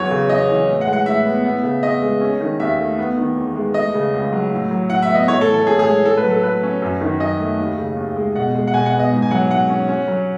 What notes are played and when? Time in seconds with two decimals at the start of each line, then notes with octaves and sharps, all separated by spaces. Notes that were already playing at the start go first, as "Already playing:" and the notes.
Already playing: E2 F#3 C#5
0.10 C#3
0.29 E2 D#5
0.48 E3
0.68 A2
0.81 F#5
0.87 G#3
0.93 F#5
1.06 A2 E5
1.25 B3
1.44 B3
1.63 C#3
1.83 E2 D#5
2.02 G#3
2.21 C#4
2.41 D#3
2.60 D#2 E5
2.79 A3
2.98 B3
3.17 D#3
3.37 E2
3.55 G#3
3.74 A3 D#5
3.94 C#3
4.14 C#2
4.32 F#3
4.52 A2
4.71 F#3
4.90 A2 F#5
5.02 E5
5.10 B3
5.15 D#5
5.28 A2 C#5
5.41 A4
5.47 E3
5.54 A4
5.67 A2 G#4
5.79 G#4
5.86 G#3
6.05 A2 A4
6.17 B4
6.24 F#3
6.30 A4
6.43 A2 B4
6.63 C#4
6.82 F#2
7.01 D#3
7.20 F#2 D#5
7.39 A3
7.59 D#2
7.78 C#3
7.96 D#2
8.16 G#3
8.35 B2 F#5
8.55 G#3
8.67 F#5
8.74 B2 G#5
8.86 F#5
8.93 B3
8.99 D#5
9.12 G#2
9.22 G#5
9.31 F#3 F#5
9.50 G#2 F#5
9.70 C#4
9.89 C#4
10.08 F#3